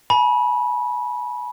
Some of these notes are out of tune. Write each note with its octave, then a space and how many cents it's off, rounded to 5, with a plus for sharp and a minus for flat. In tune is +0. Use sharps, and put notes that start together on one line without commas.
G#5 +40 B5 -25